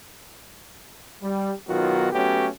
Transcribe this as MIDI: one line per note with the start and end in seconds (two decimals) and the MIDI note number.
1.22 1.52 55
1.68 2.10 35
1.68 2.10 51
1.68 2.10 54
1.68 2.10 59
1.68 2.10 65
1.68 2.10 66
2.13 2.48 54
2.13 2.48 57
2.13 2.48 59
2.13 2.48 61
2.13 2.48 66
2.13 2.48 67